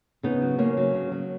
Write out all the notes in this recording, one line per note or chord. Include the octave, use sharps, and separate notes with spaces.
C#3 B3 D#4
F#3
C#3 A#3 C#4
F#3
C#3
F#3